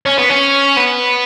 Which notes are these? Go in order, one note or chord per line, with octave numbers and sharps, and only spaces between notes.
C#4
B3
C#4
B3